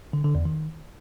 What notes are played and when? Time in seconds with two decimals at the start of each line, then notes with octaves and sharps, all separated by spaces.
0.13 D3
0.24 D3
0.35 E2
0.45 D#3